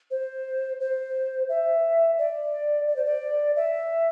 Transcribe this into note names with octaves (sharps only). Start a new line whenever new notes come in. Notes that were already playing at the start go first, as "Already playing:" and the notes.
C5
C5
E5
D5
D5
C5
D5
E5